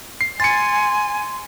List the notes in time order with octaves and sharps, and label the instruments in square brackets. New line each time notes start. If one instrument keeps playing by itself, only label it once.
[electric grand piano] C7
[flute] G#5 [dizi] C6 [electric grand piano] A6 C#7